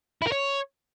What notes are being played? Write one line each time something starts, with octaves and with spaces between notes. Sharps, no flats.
E4
A#4
C#5